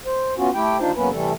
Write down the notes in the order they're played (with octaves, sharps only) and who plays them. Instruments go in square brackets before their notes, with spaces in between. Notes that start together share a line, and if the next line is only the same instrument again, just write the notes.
[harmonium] C5
B3 C#4 F4 F#4
A3 E4 G4 G5
D#2 D4 D#4 F4 C5
E2 F#3 A#3 B3 C#4 B4
C3 E3 G3 A3 A4